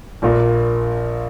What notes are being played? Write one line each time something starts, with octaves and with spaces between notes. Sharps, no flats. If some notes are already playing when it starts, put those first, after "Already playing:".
A#1 A#2 A#3